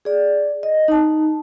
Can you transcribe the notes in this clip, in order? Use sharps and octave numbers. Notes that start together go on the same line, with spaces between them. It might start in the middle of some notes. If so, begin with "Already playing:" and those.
G#4 D5
D#5
D#4 A5